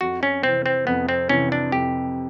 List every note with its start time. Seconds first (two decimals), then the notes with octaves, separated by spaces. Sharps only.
0.01 F2 F#4
0.23 C#4
0.43 C3 E3 C4
0.66 C4
0.87 F2 B3
1.09 C4
1.29 C3 E3 C#4
1.52 D4
1.72 F2 G4